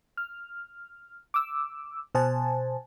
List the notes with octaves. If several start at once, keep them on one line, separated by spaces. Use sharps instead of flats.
F6
D6 E6
B2 C5 G#5 A5